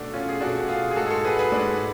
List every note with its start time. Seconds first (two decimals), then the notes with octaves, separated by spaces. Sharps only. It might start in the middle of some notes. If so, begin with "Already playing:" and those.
Already playing: B2 A3 D4
0.13 C#4 F4
0.29 G#4
0.41 B2 A3 D4 F#4
0.69 F4 G#4
0.91 G#4
0.96 G#2 G#3 F#4 A4
1.06 G#4
1.10 F#4 A4
1.25 G#4 B4
1.39 G#4 B4
1.52 G#2 G#3 D4